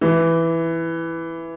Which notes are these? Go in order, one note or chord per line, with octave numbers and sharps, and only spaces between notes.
E3